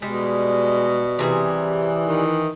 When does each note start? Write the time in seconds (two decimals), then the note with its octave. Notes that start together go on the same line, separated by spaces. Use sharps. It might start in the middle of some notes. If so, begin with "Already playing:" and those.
0.02 B2 G3 G#3
1.19 C3 E3 G3 G#4
2.05 D#3